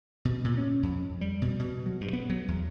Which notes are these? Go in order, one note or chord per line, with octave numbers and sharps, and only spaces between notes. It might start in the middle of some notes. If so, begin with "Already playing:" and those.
B2
A#2
C#4
F2
G3
B2
B2
F#3
G2
B3
F#3
E2